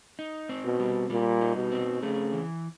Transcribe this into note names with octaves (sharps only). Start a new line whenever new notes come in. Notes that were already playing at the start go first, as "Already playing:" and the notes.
D#4
C4
B2
G3
A#2 G3
D#4
B2
C4
C#3 A3
E3